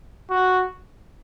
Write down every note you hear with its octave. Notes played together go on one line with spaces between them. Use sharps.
F#4